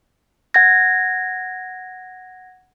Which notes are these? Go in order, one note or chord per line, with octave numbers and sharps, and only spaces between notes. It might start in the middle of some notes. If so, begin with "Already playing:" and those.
F#5 G#6 A#6